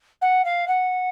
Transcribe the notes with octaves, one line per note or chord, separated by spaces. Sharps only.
F#5
F5
F#5